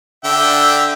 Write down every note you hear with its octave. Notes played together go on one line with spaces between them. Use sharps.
D3 E5 G5